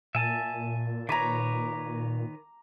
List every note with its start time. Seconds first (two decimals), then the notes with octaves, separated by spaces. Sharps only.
0.15 A#2 E5 G#5 A5
1.09 D#3 B4 C#5 A#5 D6